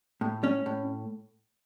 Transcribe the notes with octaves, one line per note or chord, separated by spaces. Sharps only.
A2
C#4
A2